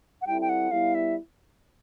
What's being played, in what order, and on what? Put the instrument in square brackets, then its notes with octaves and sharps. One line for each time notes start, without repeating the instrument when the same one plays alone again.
[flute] F#5
[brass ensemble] G3 C4 E4 A4 [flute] G5
[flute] G5
F#5
[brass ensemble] G3 B3 E4 [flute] F5
[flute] E5